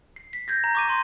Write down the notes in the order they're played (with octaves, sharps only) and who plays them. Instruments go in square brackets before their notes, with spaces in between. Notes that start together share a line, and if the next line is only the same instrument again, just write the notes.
[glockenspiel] C7
B6
G6 G#6 A#6
A#5
C#6 D6 D#7
C6